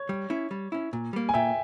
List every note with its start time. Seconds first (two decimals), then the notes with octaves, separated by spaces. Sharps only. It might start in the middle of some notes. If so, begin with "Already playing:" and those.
Already playing: C#5
0.09 G3
0.30 C#4 E4
0.51 G3
0.72 C#4 E4
0.93 A#2
1.13 G3 A#3
1.29 G#5
1.34 A#2 E5 G5